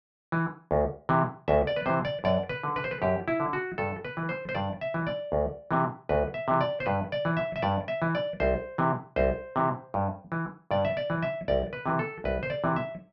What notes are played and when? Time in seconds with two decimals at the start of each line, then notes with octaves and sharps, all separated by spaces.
0.32 E3
0.71 D2
1.09 C3 E3
1.48 D2 E5
1.67 D5
1.76 B4
1.86 C3 E3 C5
2.05 D5
2.24 F#2 D5
2.49 B4
2.63 D3
2.76 B4
2.84 C5
2.91 B4
3.02 F#2 G4
3.28 E4
3.40 D3
3.53 F#4
3.78 G2 A4
4.05 B4
4.17 E3
4.29 C5
4.49 C5
4.55 G2 D5
4.81 E5
4.94 E3
5.07 D5
5.32 D2
5.71 C3 E3
6.09 D2 B4
6.34 E5
6.48 C3 E3
6.61 D5
6.80 C5
6.86 G2 B4
7.12 D5
7.25 E3
7.37 E5
7.56 E5
7.62 G2 D5
7.88 E5
8.02 E3
8.15 D5
8.40 C2 C5
8.78 C3 E3
9.16 C2 C5
9.56 C3 E3
9.94 G2
10.32 E3
10.71 G2 D5
10.85 E5
10.97 D5
11.10 E3
11.23 E5
11.48 C2 D5
11.73 B4
11.86 C3 E3
11.99 A4
12.24 C2 B4
12.43 C5
12.50 D5
12.64 C3 E3
12.76 E5